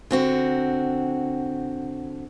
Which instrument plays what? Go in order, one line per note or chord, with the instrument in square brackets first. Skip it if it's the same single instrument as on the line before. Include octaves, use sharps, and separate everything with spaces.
[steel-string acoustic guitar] D3 C4 F#4